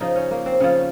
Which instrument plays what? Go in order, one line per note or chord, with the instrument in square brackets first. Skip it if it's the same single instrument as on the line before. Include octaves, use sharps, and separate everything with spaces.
[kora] C#3 F3 D#4
C#4
A#3
C4
C#3 F3 C#4